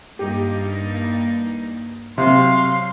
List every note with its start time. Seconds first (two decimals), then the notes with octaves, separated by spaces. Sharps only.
0.19 G2 A#3 D#4 G4
2.18 C3 F#3 F5 C6